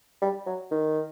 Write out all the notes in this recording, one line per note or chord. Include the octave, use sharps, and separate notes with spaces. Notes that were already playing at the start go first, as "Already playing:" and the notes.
G3
F#3
D#3